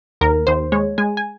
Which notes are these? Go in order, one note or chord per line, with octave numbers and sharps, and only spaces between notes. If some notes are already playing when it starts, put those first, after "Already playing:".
D#2 A#4
D#2 C5
G#3 C#5
G#3 G#5
G#5